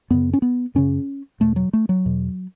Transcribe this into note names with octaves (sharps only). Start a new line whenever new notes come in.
F#2 C#3 B3
C#4
B3
F#2 C#3 C#4
E2 B2 A3
F#3
A3
F#3
E2 B2